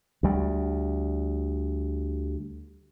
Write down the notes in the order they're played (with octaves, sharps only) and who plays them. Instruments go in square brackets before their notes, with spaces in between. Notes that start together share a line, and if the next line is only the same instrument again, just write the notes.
[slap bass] D2 G3